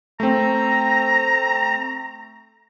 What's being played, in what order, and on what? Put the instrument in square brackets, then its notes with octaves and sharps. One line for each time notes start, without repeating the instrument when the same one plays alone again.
[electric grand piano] A3 C4 [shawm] A#5